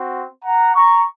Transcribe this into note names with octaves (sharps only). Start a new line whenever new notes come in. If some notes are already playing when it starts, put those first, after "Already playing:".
Already playing: C4 F#4
F#5 A#5
A#5 C#6